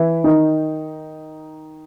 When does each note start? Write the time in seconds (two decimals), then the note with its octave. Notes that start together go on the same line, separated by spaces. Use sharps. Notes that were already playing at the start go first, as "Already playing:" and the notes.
Already playing: E3 E4
0.24 D#3 D#4